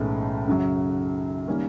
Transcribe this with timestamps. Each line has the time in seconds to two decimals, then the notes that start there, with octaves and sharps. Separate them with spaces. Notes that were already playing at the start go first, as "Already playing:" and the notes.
Already playing: B1 A2 E3 G#3 C#4
0.47 F#2 C#3 F#3
1.48 D#3 G3 A#3 C#4